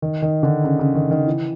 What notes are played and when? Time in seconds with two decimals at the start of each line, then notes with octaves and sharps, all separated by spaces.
0.02 D#3
0.22 D#3
0.43 D3
0.64 C#3
0.79 C#3
0.95 D#3
1.11 D#3
1.27 E3